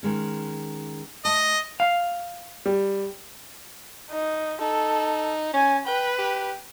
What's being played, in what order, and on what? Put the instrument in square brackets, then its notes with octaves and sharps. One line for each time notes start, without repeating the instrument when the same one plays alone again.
[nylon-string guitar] D#3 G#3 C#4
[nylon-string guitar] A3 A5 [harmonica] D#5
[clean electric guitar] F5
[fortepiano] G3
[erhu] D#4
[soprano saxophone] D#4 [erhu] A4
[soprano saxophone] C#4 [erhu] G#5
[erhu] B4 [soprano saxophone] G5
[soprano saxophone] G4